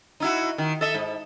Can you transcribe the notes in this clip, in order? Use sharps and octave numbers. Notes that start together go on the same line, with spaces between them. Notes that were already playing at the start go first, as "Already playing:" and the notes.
D#4 E4 F#4
D#3
A4 D#5 E5
G#2